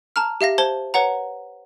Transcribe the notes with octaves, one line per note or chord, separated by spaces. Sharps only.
A5 A#5 F6
G4 E5 F5 A#6
C5 A5 G#6 G7
B4 C#5 F#5 A#5